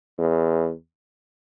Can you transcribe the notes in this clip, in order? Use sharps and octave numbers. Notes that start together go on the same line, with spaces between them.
E2